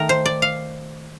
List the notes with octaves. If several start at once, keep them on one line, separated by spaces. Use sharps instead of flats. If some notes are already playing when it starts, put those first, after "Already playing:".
Already playing: D#3 A3 A#4
C5
D5
F5